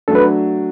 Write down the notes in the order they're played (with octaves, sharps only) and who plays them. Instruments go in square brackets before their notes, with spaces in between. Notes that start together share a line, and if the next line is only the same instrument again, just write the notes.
[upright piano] F#3 A3 D4 [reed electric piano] A4
[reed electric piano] B4